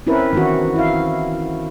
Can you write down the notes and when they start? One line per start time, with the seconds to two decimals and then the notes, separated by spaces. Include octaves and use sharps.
0.07 C4 C#4 E4 A#4 B4
0.33 D#3 E3 B3 C#4 F#4
0.76 E4 F5